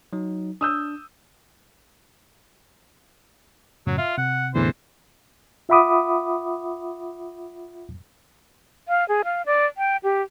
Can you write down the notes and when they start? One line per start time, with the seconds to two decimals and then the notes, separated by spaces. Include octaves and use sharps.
0.13 F#3 D#4
0.61 D4 D#6 E6 G6
3.87 F#2 A2 C#3 F#3
3.98 F4 E5
4.18 C3 F#5
4.55 E2 A2 D3 E3 C5
5.69 F4 E5 F#5 B5 D6 D#6
8.88 F5
9.08 G#4
9.25 F5
9.46 D5
9.78 G5
10.03 G4